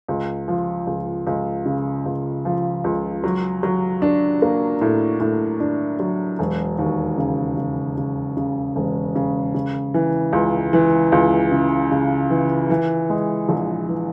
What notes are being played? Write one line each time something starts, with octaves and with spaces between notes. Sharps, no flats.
C#2
F3
C#2
C#2
C#3
C#2
F3
C#2
F#3
F#3
D4
A#3
A2
A2
D4
F#3
E1
D#2
C#3
C#3
C#3
C#3
E1
C#3
C#3
E3
C#2
E3
C#2
C#3
C#3
E3
E3
G#3
A#1
E3